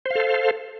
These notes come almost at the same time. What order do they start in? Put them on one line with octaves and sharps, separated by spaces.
C5 F5 A4